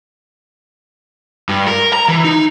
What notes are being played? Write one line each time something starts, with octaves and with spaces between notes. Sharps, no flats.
G2
A#4
A#5
E3
D#4